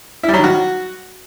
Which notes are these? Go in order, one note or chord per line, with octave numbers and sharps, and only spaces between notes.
E4
G3
F#3
D#3
F#4